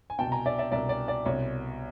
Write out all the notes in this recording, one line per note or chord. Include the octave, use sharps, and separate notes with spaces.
G#5
C2 B2 G5 A5
G#5 A#5
D5 E5
D5 E5
C2 B2 D5 E5
D5
D5
C2 B2 C#5